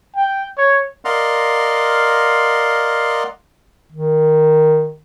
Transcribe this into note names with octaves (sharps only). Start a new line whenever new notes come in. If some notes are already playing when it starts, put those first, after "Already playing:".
G5
C#5
A#4 D5 D#5 F5 F#5 C6
D#3